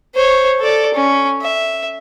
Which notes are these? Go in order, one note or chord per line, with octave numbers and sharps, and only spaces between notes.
C5 C#5
A4 D5
C#4
E5